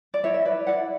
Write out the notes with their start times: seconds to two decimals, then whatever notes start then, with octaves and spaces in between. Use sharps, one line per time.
0.14 D5
0.23 E4 C#5 E5
0.34 E5
0.45 B4 D5
0.67 E4 D5 F#5